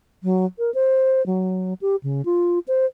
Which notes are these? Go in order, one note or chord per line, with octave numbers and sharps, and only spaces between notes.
F#3
A#4
C5
F#3
G4
C#3
F4
C5